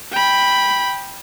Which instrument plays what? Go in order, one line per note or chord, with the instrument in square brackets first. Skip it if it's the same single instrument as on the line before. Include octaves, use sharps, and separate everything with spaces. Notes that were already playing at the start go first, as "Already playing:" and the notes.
[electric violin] G5 B5